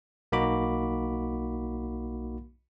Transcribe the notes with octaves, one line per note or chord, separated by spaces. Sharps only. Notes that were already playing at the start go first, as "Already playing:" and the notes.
B1 A#3 D#4 F#4 B5 D6